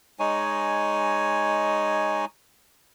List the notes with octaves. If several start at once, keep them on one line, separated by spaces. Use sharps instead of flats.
G#3 D#4 C#5 G#5